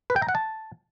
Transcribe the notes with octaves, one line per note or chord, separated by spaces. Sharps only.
B4
G5
A#5
F#5
A5